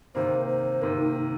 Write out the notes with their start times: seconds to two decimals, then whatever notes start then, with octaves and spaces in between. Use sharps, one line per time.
0.15 C3 D#3 A#3 C5
0.48 C5
0.81 C3 D#3 A#3 A#4
0.98 D#4